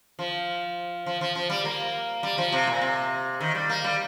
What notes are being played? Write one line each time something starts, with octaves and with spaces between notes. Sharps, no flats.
F3
F3
F3
F3
G3
A#3
G3
F3
C3
A#2
C3
D#3
G3
A#3
G3